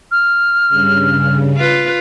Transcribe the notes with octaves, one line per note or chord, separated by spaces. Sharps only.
F6
G2 C#3
F4 B4